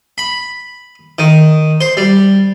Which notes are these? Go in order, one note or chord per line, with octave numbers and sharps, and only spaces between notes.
B5
D#3
C5
G3